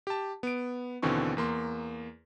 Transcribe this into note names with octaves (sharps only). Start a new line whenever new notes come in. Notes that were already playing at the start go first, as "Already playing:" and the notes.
G4 A5
B3 D7
D#2 B2 D3 E3 C4 C#6
E2 A#3 C6